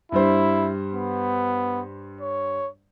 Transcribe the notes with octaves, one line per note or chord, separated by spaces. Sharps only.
G2 G3 E4 C5
B3
C#5